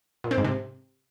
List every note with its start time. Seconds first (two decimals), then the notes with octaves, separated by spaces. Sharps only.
0.24 A#2
0.31 C4
0.38 G#2
0.44 C3